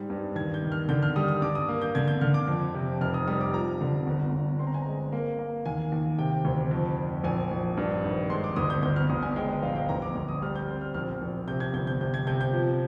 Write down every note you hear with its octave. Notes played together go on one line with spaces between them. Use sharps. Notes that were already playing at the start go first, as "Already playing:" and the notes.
Already playing: G#2 G3 G#3
G2
D#2 G#6
G6
D#3
F6
D3 G6
F6
G3 D#6
D#6
G2 D6
D#6
A#3
G6
D3 G#6
G6
D3 F6
D6
F2
C3
F1 F6
D#6
G3 D#6
D6
F3 A#5
D3
G1
G1
C4 C6
A#5
G#5
G#3 A#5
A#3
A#3
D#2 G#5
D#2
C3 G5
D2
F2
F2
A#1 G#5
A#1
G2
G#1
G#3 C6
D6
D2 D#6
G6
G1 G6
F6
G1 D#6
G#5
G#3 G5
D#5
A#1 F5
G5
D2 A#5
D6
D2 D6
D#6
G3 F6
G6
C4 G6
F6
A#1 F6
A#1
C3 G6
G#6
G1 G6
G6
C3 G6
G#6
C3 G6
G6
F3